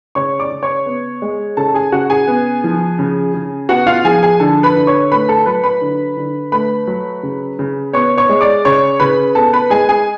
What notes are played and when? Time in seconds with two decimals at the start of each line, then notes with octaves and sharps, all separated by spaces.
0.15 C#3 C#5 C#6
0.40 D5 D6
0.51 C#3
0.63 C#5 C#6
0.86 B3
1.22 G#3
1.57 C#3 A4 A5
1.74 G#4 G#5
1.92 C#3 F#4 F#5
2.10 G#4 G#5
2.27 B3
2.64 F3
2.99 C#3
3.34 C#3
3.69 B3 F#4 F#5
3.87 F4 F5
4.05 F3 G#4 G#5
4.23 G#4 G#5
4.40 D3 A4 A5
4.63 B4 B5
4.76 D3
4.87 C#5 C#6
5.12 A3 B4 B5
5.29 A4 A5
5.46 F#3 B4 B5
5.64 B4 B5
5.81 D3
6.17 D3
6.52 A3 B4 B5
6.87 F#3
7.23 C#3
7.59 C#3
7.93 B3 C#5 C#6
8.17 C#5 C#6
8.29 G#3
8.41 D5 D6
8.65 C#3 C#5 C#6
9.00 C#3 B4 B5
9.35 B3 A4 A5
9.53 B4 B5
9.70 G#3 G#4 G#5
9.89 G#4 G#5